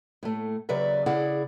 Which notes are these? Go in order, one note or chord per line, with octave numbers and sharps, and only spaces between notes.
A2 A3
D#2 C#3 F#3 B4 D5 E5
C#3 E4 G#4 D5 F#5